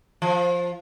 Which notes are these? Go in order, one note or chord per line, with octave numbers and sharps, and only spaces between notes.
F3